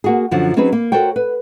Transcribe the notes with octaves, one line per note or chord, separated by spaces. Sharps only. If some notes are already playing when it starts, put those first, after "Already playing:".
A#3 F#4 G#4
F#2 D3 F3 F#3
F#3 C4 C#4 D#4 G#4 B4
A#3
F#4 A4 A#4 C5 C#5 G5
B4